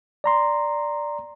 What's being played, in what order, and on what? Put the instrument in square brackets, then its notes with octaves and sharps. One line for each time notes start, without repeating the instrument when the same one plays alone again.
[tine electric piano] D5 A#5 C6